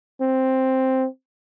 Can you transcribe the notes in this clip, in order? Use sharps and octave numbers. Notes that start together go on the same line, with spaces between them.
C4